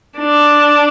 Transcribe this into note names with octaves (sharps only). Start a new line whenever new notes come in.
D4